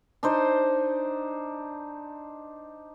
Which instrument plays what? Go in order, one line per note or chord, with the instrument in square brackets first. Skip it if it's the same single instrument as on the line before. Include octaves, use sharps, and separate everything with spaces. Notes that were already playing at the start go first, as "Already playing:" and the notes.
[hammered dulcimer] D4 D#4 C5